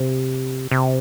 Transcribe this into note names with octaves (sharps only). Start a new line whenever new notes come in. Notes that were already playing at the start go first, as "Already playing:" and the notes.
Already playing: C3
C3